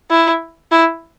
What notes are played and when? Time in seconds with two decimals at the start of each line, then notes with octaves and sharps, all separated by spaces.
0.10 E4
0.71 E4